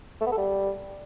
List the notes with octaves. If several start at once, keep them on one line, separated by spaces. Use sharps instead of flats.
A3
B3
A4
G3